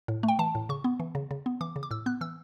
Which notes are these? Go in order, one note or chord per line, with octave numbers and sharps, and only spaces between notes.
A2
A3
G5
E3 A5
A2
C#3 C#6
B3
E3
C#3
C#3
B3
E3 D6
C#3
D6
A2 E6
B3 F#6
E3 E6